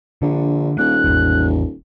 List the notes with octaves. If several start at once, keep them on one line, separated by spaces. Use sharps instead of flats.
A#1 D3
D#1 A#3 F#6
E1 A1 E2